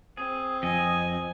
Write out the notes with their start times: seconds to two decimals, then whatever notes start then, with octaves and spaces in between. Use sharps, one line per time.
0.17 C4 G#4
0.63 F2 D#5 G#5